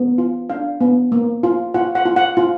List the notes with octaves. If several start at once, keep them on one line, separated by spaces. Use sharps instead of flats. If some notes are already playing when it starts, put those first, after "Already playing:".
Already playing: B3
F4
D4 F5
B3
A#3
F4
F4 F#5
F#5
F4
F#5
F4